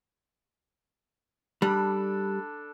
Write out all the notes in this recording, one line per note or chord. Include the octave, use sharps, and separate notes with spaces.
G3 D4 A4 B5